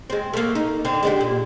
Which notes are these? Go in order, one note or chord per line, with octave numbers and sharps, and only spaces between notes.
G#3 C4
A3 A#3
D#4
D3 C4
G#3 D4 G4
A#2